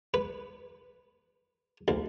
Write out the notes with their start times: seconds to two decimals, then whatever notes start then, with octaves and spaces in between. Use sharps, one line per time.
0.14 B4
1.88 D2